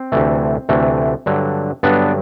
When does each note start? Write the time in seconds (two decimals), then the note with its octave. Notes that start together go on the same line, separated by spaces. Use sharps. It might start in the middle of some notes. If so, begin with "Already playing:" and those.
Already playing: C4
0.12 D2 C3 E3 A3
0.69 D2 C3 E3 A3
1.26 G2 D3 F#3
1.83 G2 D3 F#3 B3 D4